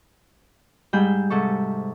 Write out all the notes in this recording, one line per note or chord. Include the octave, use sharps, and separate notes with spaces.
G#2 G3 G#4 B5 E6 G6
G#2 C3 A4 C#6